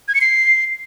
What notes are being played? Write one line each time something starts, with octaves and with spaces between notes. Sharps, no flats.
G#6
C#7
C7